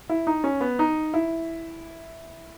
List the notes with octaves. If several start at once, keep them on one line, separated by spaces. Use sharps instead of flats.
E4
D#4
C#4
B3
D#4
E4